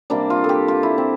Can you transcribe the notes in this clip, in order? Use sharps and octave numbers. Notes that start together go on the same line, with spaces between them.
C3 G3 A#3 D4
F4
A4
G4
F4
E4
C4